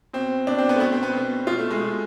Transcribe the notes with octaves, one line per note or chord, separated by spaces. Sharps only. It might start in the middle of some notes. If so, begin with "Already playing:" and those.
B2 C4
B2 D4
C4
B3
A3
B2 B3
C4
B3
B2
B2 F4
A3
G#3
B2